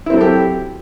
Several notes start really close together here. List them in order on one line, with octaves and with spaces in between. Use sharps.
E4 C4 F#3 A4 G4